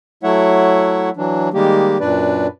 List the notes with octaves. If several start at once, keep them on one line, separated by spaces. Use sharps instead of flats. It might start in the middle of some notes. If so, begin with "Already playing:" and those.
F#3 A3 E4 C#5 E5 F#5
E3 F#3 D4
D#3 G3 G#3 A#3 G4
F#2 A#2 D4 B4 D5